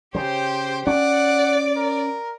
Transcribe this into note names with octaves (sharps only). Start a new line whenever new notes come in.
C#3 G4 C5
C#4 D5 F#5
A#4